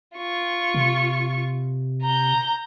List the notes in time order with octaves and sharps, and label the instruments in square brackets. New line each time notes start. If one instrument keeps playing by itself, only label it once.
[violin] F4 C#6
[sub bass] C3
[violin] A#5 G6